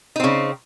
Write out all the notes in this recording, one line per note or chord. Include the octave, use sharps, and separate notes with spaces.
C#3 C4 D#4